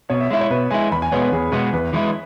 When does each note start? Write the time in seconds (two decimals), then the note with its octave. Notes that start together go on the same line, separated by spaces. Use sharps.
0.10 B2 C#5
0.20 E5
0.31 G#3 E4 E5
0.41 C#5
0.50 B2 B4
0.71 G#3 E4 G#5
0.92 E2 B5
1.02 G#5
1.12 B2 G#3 B3 C#5
1.21 B4
1.32 E2 G#4
1.52 B2 G#3 B3 B4
1.73 E2 B4
1.93 E3 G#3 E4